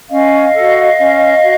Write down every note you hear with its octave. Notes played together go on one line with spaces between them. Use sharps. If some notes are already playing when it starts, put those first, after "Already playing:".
C#4 D#5 F5
F#4 A4
C#4
F#4